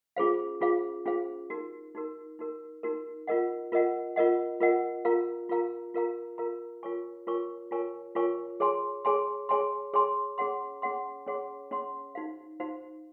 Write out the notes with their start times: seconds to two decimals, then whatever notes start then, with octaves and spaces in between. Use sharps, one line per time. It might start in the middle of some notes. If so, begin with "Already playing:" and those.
0.17 C#4 F4 G#4 C5 F5
0.61 C#4 F4 G#4 C5 F5
1.06 C#4 F4 G#4 C5 F5
1.50 D#4 F#4 A#4
1.95 D#4 F#4 A#4
2.39 D#4 F#4 A#4
2.83 D#4 F#4 A#4
3.27 F4 A#4 D#5 F#5
3.72 F4 A#4 D#5 F#5
4.16 F4 A#4 D#5 F#5
4.60 F4 A#4 D#5 F#5
5.05 F4 A#4 F5 A#5
5.49 F4 A#4 F5 A#5
5.94 F4 A#4 F5 A#5
6.38 F4 A#4 F5 A#5
6.83 F4 A#4 C#5 G#5 C#6
7.27 F4 A#4 C#5 G#5 C#6
7.71 F4 A#4 C#5 G#5 C#6
8.15 F4 A#4 C#5 G#5 C#6
8.60 G#4 C#5 G#5 C6
9.05 G#4 C#5 G#5 C6
9.49 G#4 C#5 G#5 C6
9.94 G#4 C#5 G#5 C6
10.38 C#4 G#4 C#5 F#5 C6
10.82 C#4 G#4 C#5 F#5 C6
11.27 C#4 G#4 C#5 F#5 C6
11.71 C#4 G#4 C#5 F#5 C6
12.15 D#4 F#4 C5 F5
12.60 D#4 F#4 C5 F5